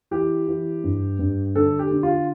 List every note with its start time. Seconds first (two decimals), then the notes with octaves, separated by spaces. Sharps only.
0.11 E3 G4
0.48 E3
0.84 G2
1.19 G2
1.56 D3 A4
1.79 G4
1.91 D3
2.03 F4